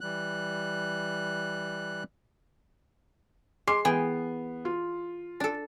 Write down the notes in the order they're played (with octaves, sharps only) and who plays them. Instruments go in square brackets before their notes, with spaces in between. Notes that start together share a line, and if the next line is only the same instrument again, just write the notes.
[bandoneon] E3 G3 F#6
[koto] G#3 [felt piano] C6 D6 C7
[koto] E3 G#4 G5 [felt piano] B3
[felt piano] F4
[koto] D4 A4